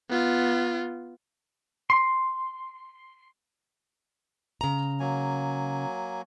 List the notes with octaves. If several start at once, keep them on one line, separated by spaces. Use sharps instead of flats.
B3 F4
C6
C#3 A#5
F#3 A#3 G#5